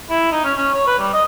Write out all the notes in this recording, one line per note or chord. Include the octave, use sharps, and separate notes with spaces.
E4
D#4
C#4
C#4
C#5
B4
G3
D#5